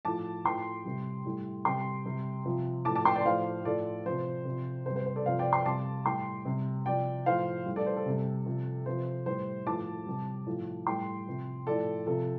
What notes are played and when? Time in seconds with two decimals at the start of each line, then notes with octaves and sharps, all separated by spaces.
0.05 A2 F3 A5 D6
0.45 A2 F3 G5 C6
0.85 C3 G3
1.26 A2 G3
1.65 C3 G3 G5 C6
2.06 C3 G3
2.46 C3 F3
2.85 A2 F3 A5 D6
2.95 A5 D6
3.05 G5 C6
3.16 D5 G5
3.25 A2 F3 C5 F5
3.65 A2 F3 A4 D5
4.06 C3 F3 C5
4.45 C3 F3
4.86 C3 C5
4.90 G3
4.96 C5
5.06 C5
5.16 A4 D5
5.26 C3 F3 C5 F5
5.39 D5 G5
5.52 G5 C6
5.66 C3 G3 A5 D6
6.06 A2 G3 G5 C6
6.45 C3 G3
6.86 C3 F3 D5 G5
7.26 A2 F3 C5 F5
7.66 A2 G3
7.76 A4 D5
7.86 C5
7.97 A4
8.06 C3 G3
8.46 C3 F3
8.86 C3 F3 C5
9.26 A2 G3 C5
9.67 A2 F3 A5 D6
10.06 C3 G3
10.47 A2 F3
10.87 A2 G3 G5 C6
11.26 C3 F3
11.66 A2 F3 A4 D5
12.07 C3 F3 A4